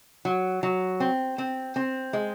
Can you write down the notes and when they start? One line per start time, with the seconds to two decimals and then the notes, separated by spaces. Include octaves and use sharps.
0.25 F#3
0.63 F#3
1.00 C4
1.38 C4
1.76 C4
2.13 G#3